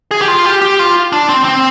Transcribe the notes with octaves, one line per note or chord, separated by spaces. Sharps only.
G#4
G4
F4
G4
G4
F4
D4
C4
C4